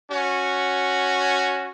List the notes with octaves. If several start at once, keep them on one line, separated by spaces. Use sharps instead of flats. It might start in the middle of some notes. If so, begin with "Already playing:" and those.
C#4 F#4